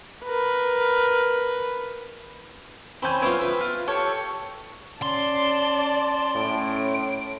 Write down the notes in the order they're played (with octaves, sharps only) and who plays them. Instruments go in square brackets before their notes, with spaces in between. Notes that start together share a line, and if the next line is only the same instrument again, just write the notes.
[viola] A#4 B4
[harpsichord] C4 C#4 G#5 [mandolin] B5 G6
[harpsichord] B3 C#4 F4 [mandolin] E4 C5
[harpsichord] B4
[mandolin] F4
G4 A4 C#5
[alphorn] C#4 [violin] D5 A5 [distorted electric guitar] C6
[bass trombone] A2 [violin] D7